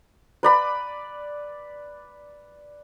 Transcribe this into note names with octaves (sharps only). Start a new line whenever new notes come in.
B4 D5 B5